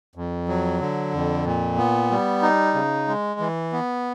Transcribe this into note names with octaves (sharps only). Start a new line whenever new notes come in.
F2
F#3
D3
F2
A#2
B3
G3
D#4
C#3
G#3
E3
B3